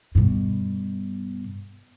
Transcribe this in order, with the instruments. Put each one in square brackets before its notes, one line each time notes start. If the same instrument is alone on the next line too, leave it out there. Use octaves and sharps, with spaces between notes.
[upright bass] G2 B2